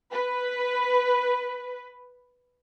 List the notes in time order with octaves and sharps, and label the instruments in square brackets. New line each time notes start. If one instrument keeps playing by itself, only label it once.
[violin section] B4